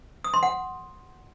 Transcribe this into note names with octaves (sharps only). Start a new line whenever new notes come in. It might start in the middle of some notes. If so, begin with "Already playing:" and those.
D#6
C6
F#5